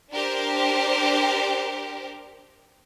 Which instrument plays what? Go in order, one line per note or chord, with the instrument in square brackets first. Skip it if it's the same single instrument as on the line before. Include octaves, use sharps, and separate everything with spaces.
[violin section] D4 G4 A#4 C5